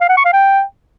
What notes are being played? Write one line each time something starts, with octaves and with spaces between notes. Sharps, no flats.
F5
F#5
C#6
F5
G5